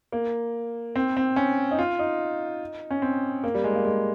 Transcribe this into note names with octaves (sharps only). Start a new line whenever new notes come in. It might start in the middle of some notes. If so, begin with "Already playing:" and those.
A#3
C4
C4
C#4
D#4
F4
D#4
C#4
C4
A#3
G3
G#3
A#3
G#3